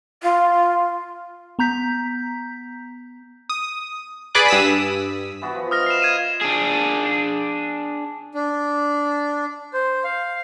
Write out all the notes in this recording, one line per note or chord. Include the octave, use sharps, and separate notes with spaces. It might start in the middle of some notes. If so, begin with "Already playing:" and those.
F4
B3 A#5 G6 B6
D#6
G#4 B4 D5 B5 D6 F#6
G2 D#6 E6 B6
E3 B3 F#4
F3
D#5 D#6 F6 A#6
C7 E7
G#6 D#7 E7
D4 G#4
D4
C5
F5